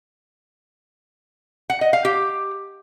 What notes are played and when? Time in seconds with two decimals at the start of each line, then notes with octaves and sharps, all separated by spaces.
1.70 F#5
1.81 D#5
1.93 F5
2.05 G4